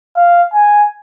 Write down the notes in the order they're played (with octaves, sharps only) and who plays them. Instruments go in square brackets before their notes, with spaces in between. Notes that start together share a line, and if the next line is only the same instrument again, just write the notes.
[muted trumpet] F5
G#5